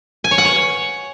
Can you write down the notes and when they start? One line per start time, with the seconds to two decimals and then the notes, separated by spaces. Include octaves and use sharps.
0.24 G#5
0.31 C#5
0.38 F#5
0.45 C#5